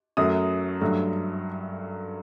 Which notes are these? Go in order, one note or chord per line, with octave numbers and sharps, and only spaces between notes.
F#2 F#3 A3 D#6
G2 F#3 A3